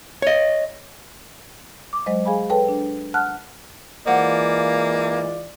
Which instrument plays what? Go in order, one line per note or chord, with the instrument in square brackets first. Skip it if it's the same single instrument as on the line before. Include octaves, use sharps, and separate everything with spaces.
[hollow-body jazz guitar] C#5 D#5
[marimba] D6
F#3 G#3 C5 D#5
G#4 F5 G#5 B5
A4 B4 C#5 G5 A5
D4
F#5 A5 F6 F#6
[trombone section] E3 G#3 F4 [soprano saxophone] A#3 [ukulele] A4 C5 F#5 [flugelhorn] D5